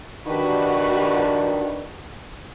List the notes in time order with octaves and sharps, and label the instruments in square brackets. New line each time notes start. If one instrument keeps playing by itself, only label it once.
[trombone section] D#3 D4 [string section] F#4 G4 B4